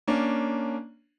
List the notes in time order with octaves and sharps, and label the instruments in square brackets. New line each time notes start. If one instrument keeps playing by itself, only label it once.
[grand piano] A#3 C#4 D4